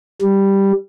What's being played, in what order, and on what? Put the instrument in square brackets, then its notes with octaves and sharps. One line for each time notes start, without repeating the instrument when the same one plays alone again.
[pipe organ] G3